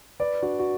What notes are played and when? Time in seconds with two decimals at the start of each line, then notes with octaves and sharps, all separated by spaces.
0.20 B4 D5
0.42 D4 F#4
0.59 F#4